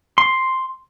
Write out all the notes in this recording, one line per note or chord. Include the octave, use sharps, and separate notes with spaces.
C6